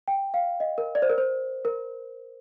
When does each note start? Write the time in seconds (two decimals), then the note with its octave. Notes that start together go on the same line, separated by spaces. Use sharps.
0.08 G5
0.34 F5
0.60 D#5
0.78 A#4
0.95 D5
1.02 C5
1.09 A#4
1.18 C5
1.65 A#4